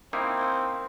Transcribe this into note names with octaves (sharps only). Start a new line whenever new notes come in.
A#3 C4 D#4 E4